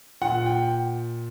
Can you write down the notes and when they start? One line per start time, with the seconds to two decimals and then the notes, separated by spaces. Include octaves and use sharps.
0.21 A#2 F#5
0.46 G5